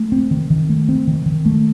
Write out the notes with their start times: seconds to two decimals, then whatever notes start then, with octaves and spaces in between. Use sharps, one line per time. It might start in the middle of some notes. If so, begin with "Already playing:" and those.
Already playing: A3
0.12 C4
0.31 D#3
0.50 D#3
0.69 A3
0.89 C4
1.07 D#3
1.26 D#3
1.46 A3